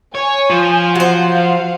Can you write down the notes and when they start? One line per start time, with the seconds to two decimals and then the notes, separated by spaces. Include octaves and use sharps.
0.15 C#5 G#5
0.50 F3
0.96 F#3 C5 F#5
1.28 F5 F#5